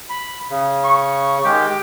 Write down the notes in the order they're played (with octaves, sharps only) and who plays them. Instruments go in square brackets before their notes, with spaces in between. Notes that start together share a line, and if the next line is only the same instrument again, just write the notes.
[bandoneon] B5
C#3
[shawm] C#6
[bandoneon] D#3 G#3 [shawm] G4